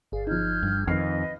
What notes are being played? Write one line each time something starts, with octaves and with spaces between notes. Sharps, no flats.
G1 G#4 D5 F5
F3 D#4 F6 G6 G#6
G2
F2 D#3 B4 D#5 F6 C7